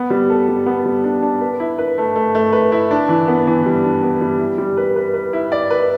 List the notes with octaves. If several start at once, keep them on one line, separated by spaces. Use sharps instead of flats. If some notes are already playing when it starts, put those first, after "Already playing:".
Already playing: B3
G3
A4
G3
B3
G3
D4
D4
B4
E4
B4
A3
A3
A3
B4
E4
D4
E3
B3
E3
G3
D4
B3
G3
E4
G3
B4
B4
B4
E4
D5
B4